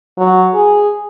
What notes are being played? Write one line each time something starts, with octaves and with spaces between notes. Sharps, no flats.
F#3
G#4